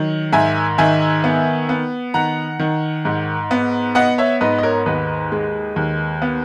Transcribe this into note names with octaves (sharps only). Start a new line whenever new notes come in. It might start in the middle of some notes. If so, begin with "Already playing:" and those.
Already playing: D#3 F#3
G#2 E5 G#5
D#3 E5 G#5
B3
B3
D#3 F#5 A#5
D#3
G#2
B3
B3 D#5 F#5
C#5 E5
G#2 B4 D#5
D#5
A#4 C#5
D#2 B4 D#5
G#3
D#2
B3